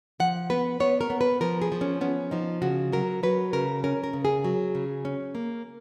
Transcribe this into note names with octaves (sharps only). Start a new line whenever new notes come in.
F3 F#5
B3 B4
B3 C#5
A#4
B3
B4
F3 A#4
G#4
F3
C#4
B3 C#4
F3 D#4
C#3 F#4
F#3 A#4
F#3 B4
C#3 A#4
C#4 A#4
A#4
C#3
G#4
F#3
C#3
C#4
A#3